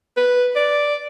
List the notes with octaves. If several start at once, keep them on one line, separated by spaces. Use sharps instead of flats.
B4
D5